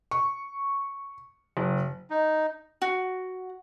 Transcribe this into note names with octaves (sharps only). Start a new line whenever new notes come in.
C#6
F#1
D#4
F#4